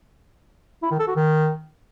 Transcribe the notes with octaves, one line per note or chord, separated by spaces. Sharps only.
E4
D#3
A4
F#4
D#3